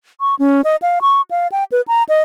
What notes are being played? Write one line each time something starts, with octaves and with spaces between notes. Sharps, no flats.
C#6
C#4
D#5
F5
C#6
F5
G5
B4
A#5
D#5